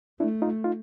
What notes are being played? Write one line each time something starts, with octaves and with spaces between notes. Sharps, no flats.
A3 D4 E4
D#4 F4
D#4 F4